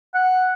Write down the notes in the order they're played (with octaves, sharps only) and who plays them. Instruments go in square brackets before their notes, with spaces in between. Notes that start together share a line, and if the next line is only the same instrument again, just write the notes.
[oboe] F#5